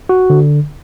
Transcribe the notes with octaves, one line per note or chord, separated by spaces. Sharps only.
F#4
D3